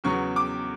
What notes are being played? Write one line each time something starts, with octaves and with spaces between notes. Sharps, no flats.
E2 C#3 F#3 B3 C#6
D6